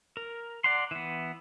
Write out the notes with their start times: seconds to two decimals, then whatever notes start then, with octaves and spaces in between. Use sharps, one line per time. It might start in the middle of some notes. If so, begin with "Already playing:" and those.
0.17 A#4
0.64 D5 F#5 A#5 C6
0.91 E3 B3